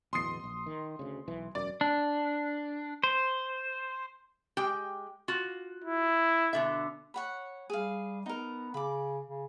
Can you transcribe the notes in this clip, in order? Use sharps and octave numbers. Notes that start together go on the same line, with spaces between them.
D1 E2 B2 C6 D#6 C7
A#1
D#3
D2 C#3
B1 E3
E1 F#2 D5
D4
C5
G#3 G4 G5
F4 F#4
E4
B2 D3 E5
C#5 F#5 B5
G3 G#4 F5
B3 D#4 A#4
C#3 B5 D6
C#3